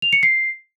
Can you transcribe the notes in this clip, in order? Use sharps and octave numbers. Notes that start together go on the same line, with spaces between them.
F7
C#7
C7